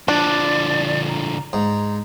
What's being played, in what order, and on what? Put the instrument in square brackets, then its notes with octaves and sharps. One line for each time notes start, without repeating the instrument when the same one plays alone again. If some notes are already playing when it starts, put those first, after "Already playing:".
[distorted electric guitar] D3 F3 [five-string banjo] D4 [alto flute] D5
[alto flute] A#5
[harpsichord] G#2 [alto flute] A#5